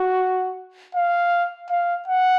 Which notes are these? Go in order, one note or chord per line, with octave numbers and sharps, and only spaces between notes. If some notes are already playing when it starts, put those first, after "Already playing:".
Already playing: F#4
F5
F5
F#5